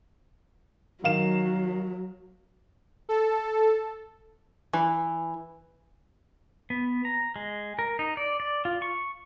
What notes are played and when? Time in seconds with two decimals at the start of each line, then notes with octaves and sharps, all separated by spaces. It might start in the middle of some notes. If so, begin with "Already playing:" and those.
1.04 D#3 F#3 F5 E7
3.09 A4
4.73 E3
6.70 B3
7.05 A#5
7.36 G#3
7.79 A#4
7.99 D#4
8.17 D5
8.40 D5
8.65 F4
8.82 C#6